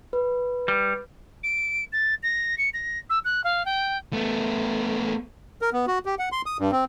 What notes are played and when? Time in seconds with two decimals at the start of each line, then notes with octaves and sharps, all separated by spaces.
0.13 B4
0.68 G3
1.43 D7
1.92 A6
2.23 A#6
2.58 C#7
2.73 A#6
3.09 E6
3.24 F#6
3.44 F5
3.65 G5
4.13 A3 B3
5.62 A#4
5.73 B3
5.87 F#4
6.06 G4
6.19 F#5
6.32 C6
6.46 D#6
6.59 G2
6.72 C4